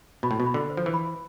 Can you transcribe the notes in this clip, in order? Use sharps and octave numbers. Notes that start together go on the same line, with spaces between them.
B2 B5
A2
B2
B5
D3
C5
F3
E3
B5